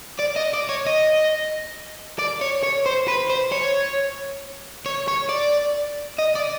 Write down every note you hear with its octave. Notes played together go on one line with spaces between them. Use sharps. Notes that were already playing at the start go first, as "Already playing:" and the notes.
D5
D#5
D5
C#5
D#5
D5
C#5
C#5
C5
B4
C5
C#5
C#5
C#5
D5
D#5
D5